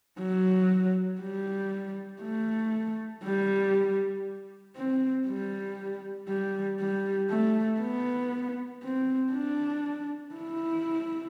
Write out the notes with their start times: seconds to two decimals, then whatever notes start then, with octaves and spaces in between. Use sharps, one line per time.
0.19 F#3
1.21 G3
2.22 A3
3.24 G3
4.76 C4
5.28 G3
6.28 G3
6.80 G3
7.30 A3
7.80 B3
8.83 C4
9.33 D4
10.35 E4